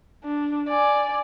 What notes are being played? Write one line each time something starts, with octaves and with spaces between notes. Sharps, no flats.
D4
D5 G#5